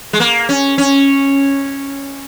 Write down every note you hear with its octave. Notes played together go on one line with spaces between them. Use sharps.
G#3
A#3
C#4
C#4